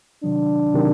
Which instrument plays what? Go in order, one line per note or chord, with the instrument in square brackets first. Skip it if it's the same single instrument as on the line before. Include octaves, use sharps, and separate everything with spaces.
[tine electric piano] C3 D#3 F#3 [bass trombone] D4
[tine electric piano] C3 D#3 F#3